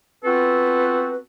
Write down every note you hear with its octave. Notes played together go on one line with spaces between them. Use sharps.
B3 C4 F4 F#4 A4 B4